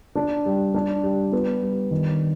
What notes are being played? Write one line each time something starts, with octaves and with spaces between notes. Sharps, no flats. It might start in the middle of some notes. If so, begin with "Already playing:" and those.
D4
G3
D4
G3
B3
G3
D#3